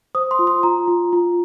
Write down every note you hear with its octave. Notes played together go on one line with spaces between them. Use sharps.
C5 D#6
C6
F4
C6
F4 A#5
F4
F4